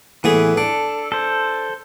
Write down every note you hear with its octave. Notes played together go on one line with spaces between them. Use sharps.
A2 E3 B3 G#4
D4 A4
A4 C5